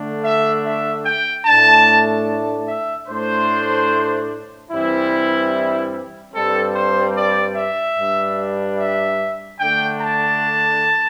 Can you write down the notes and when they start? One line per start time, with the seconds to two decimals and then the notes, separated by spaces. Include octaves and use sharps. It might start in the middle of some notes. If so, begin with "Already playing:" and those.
Already playing: D3 A3 D4
0.24 E5
0.64 E5
1.05 G5
1.46 A2 A3 D4 A5
2.68 E5
3.08 A2 A3 D4 C5
4.71 G2 E3 G3 C4 E4
6.34 G2 G3 C4 A4
6.75 C5
7.16 D5
7.56 E5
7.97 G2 G3 D4
8.78 E5
9.60 D3 A3 D4 G5
10.00 A5